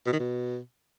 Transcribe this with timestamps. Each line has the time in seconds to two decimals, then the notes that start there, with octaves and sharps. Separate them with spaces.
0.06 B2
0.13 D#3
0.19 B2